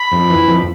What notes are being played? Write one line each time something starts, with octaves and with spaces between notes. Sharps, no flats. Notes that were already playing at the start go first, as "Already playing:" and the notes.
Already playing: B5
F2
E3
F2